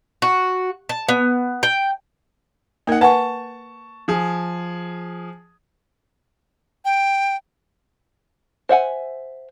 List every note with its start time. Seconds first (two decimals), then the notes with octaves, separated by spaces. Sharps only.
0.22 F#4
0.89 A5
1.09 B3
1.63 G5
2.87 A#3 D#4 A#4 F#5
3.01 B4 F#5 G#5 A5 C#6
4.08 F3 G#4
6.85 G5
8.69 C5 E5 F#5 G#5